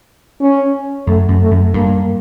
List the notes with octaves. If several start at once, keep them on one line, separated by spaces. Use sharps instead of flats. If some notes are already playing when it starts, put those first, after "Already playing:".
C#4
F#2 A3
F#2
A3
F#2
G2 A#3